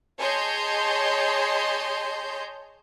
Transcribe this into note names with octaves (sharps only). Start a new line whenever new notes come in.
G#4 C#5 D#5 A5 C6 G6